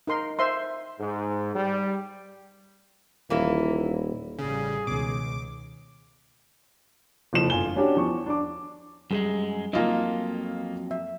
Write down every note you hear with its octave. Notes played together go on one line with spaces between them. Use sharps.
D#4 A#4 C6
C5 E5 C6
G#2
G3
D#1 E3 A#3 E4
A1 C#3 G3 G#4
C#2 B2 D#3 D6
F#1 F2 F3 E7
G1 F4 G#5 G7
C#4 D4 F#4 G4 C#5
E2 F3 C#6
D4 D6
F#2 G3 G#3 G#4
F2 F#3 A#3 D#4 F4 D#5 G#5
E5